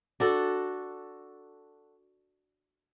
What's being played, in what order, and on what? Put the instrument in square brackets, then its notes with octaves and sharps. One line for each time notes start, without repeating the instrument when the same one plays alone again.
[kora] D4 F#4 A4